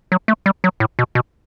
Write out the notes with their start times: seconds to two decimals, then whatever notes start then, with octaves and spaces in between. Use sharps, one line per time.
0.12 F#3
0.28 A3
0.46 G3
0.64 F#3
0.80 A2
0.99 B2
1.15 B2